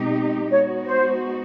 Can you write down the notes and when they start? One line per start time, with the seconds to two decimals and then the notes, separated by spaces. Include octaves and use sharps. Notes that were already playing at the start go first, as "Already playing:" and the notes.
Already playing: B2 G#3 C4 D#4 G4
0.50 G#3 B3 D#4 F#4 C#5
0.86 C5